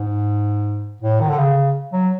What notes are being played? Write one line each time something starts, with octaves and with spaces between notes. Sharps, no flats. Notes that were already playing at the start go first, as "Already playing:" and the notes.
Already playing: G#2
A2
D#3
D3
C#3
F#3